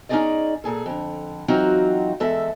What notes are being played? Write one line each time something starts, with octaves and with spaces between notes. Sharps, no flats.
C#4 D#4 E4 G#4 D5 D#5
A#2 G#4 A4
F2 D3
E3 F#3 C4 D#4 F4 F#4
E2 G#3 A4 E5